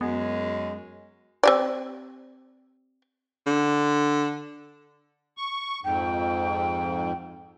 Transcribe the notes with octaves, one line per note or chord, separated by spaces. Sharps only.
F#2 G#3 B3
C4 G4 D5
D3
C#6
F2 G#2 G5